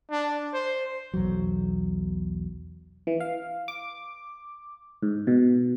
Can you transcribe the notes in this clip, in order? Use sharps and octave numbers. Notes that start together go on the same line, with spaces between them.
D4
C5
B1 E2 F#3
E3
F5
D6
G#2
B2